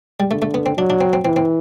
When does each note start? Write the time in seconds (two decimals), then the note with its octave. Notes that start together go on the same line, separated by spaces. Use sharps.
0.20 G3
0.31 D3 A3
0.42 A3
0.54 B3
0.66 C4
0.77 F#3 D4
0.90 D4
1.01 C4
1.13 C4
1.25 E3 C4
1.36 C4